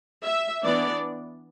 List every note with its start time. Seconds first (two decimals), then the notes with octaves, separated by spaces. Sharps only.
0.24 E5
0.64 E3 B3 D4 D5